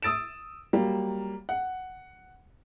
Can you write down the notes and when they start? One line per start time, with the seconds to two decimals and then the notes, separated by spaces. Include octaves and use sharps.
0.02 D#6 E6 A6 D7 E7
0.73 F#3 G3 A#3
1.49 F#5